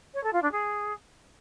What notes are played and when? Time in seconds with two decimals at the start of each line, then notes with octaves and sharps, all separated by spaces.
0.14 C#5
0.23 A4
0.33 F4
0.42 D4
0.51 G#4